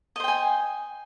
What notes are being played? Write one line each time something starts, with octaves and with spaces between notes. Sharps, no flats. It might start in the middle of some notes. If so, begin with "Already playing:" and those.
C5 D#5 G5 G#5